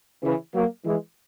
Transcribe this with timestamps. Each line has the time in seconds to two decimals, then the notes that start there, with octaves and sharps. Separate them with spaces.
0.23 C#3 E3
0.54 F#3 A#3
0.85 E3 G#3